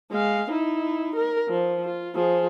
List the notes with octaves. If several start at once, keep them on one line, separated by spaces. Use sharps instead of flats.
G#3 F5
D#4 E4
A#4
F3
F4
F3 G#4